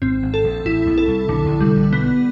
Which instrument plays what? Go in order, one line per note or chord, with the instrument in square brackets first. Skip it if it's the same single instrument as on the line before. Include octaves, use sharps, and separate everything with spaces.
[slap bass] G#1 G#2 [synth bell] C4
[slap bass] G#1 G#2
[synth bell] A4
[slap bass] A#1 A#2
[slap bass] A1 A2 [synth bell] E4
[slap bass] A#1 A#2
[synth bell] A4
[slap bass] C2 C3
[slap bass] B1 B2 [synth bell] D3
[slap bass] A#1 A#2
[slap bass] C2 C3 [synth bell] G3
[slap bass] A#1 A#2
[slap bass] B1 B2 [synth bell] B3